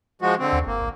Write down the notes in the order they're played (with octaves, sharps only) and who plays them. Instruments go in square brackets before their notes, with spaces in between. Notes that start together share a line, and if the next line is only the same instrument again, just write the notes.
[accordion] F3 G#3 F#4
D3 C4
[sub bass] D#2
[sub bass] G1 [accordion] A#3
[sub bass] A1